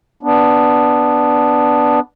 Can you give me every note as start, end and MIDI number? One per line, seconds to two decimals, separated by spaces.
0.23 2.00 59
0.23 2.00 62